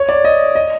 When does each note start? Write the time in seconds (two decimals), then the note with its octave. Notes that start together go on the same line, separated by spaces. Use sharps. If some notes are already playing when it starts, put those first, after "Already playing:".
Already playing: C#5
0.09 D5
0.24 D#5
0.55 D#5